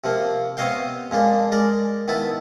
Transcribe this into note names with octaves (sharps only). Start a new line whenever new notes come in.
C3 F3 A#3
B3 C4 C#5 D#5 F5 G5
F2 G#3 A#3 D4
G#3 A#4 D5
D#3 B3 E4 A5